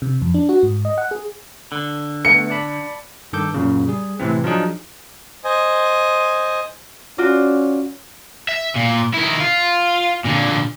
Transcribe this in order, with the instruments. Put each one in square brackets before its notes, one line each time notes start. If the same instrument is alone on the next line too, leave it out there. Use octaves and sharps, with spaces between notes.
[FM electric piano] C3
F2
D4
F#4
G#2
D#5
F#5
G#4
[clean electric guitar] D3
[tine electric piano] A3 B3 [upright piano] C#7
[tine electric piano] D5 A5 B5
G2 D#3 A4 D6 G6
F#2 A#2 C#3
G3 G#4
A2 C3 E3 C4
F3 F#3 D4 D#4 G#4
[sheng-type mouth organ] C5 D#5 G#5
[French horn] C#4 [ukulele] F4 F#4 D5
[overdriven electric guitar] E5
A#2
D#3 E4
F4
A#2 D3